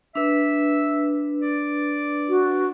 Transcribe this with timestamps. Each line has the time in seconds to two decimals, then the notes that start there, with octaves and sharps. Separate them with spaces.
0.15 D4 B4 E5
1.42 D5
2.29 F#4